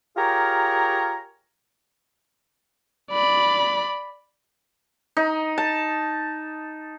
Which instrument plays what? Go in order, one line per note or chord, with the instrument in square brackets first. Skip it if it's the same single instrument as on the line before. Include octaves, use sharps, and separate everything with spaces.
[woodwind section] F4 G4 G#4 A#4 C#5 A#5
[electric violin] D5 B5
[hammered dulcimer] D#4
A5